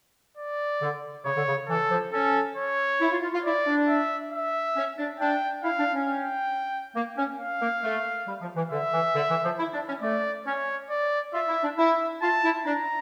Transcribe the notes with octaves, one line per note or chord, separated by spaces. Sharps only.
D5
D3
C#3 C#5
D3
C#3
E3 A4
F3
C#4 A4
C#5
E4
F4
F4
F4
E4 D5
D4
E5
E5
C#4
D4
D4 G5
E4 F5
D4
C#4
G5
A#3
C#4
F5
A#3
A3
G3
F3
E3
D3 E5
E3
D3
E3
F3
E4
D4
C#4
A3 D5
C#4 C#5
D5
F4 E5
E4
D4
E4 E5
F4 A5
E4
D4 A#5